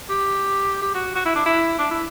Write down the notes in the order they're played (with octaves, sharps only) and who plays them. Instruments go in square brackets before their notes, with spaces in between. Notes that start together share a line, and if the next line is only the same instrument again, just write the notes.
[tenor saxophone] G4
G4
F#4
F#4
E4
D4
E4
D4
E4